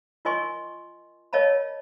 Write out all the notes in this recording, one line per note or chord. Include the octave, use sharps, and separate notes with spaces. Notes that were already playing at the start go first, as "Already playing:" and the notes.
F4 A#4 D#5 G#5 C6 C#6
A#4 C#5 D#5 F5 A5 B5